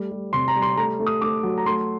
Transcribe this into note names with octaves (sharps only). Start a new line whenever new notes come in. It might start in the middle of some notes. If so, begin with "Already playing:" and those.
Already playing: G3 A3
G3
C3 C6
A#5
G3
C6
A3 A#5
A3
D#6
A3 D6
F#3
A#5
A3 C6